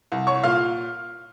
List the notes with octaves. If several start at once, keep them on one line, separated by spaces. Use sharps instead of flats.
C2
C#5 C#6
A#2 F5 F6